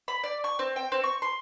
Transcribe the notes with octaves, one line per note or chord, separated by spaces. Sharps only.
B5
D5
C#6
C4
G5
C4
C#6
C6